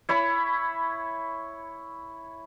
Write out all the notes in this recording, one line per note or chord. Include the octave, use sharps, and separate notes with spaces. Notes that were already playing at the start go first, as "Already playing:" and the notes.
E4 C#5 B5